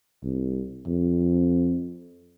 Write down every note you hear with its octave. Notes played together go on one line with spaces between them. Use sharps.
C2
F2